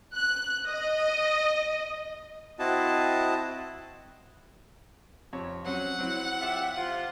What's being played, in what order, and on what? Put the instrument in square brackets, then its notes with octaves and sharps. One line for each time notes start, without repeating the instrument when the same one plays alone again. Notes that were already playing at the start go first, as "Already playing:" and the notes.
[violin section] F#6
D#5
[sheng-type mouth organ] C4 E4 F#4 D#5 A5
[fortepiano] F2 C3 C#5
[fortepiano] F#3 C4 C#4 [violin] F#5
[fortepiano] F#3 C4 E4
[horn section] F4 G4 E5
C3 F4